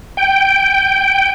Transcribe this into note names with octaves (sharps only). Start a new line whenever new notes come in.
G5